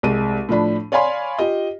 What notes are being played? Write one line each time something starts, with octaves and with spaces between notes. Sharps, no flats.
C2 G#3 D#7
A2 F3 D4 B5
C#5 D5 F5 G#5 B5 C6
F4 G4 D#5